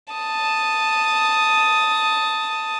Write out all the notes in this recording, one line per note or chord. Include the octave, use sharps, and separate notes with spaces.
A5 D#6